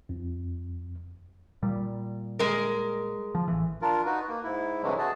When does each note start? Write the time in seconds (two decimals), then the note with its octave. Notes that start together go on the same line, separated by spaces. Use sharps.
0.09 F2
1.63 A#2 G3
2.39 G#3 A#4
3.35 F3
3.48 A1 E3
3.82 D4 F4 A#4
4.06 D#4 F#4 B4
4.28 A#3
4.44 G#2 E4
4.82 G2 C3 E3 F#3 G#3 A3
4.98 F#4 G#4 A5